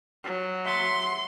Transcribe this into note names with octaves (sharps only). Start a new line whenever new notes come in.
F#3
E5 F#5 C6